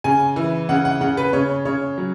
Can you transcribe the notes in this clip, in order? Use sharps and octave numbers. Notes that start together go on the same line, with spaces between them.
C#3 G#5
E3
C#3 F#5
F#5
C#3 F#5
B4
C#3 C#5
C#3 C#5
F#3